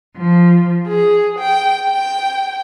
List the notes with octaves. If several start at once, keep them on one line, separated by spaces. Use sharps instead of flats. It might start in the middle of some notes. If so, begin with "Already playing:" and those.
F3
G#4
G5
G5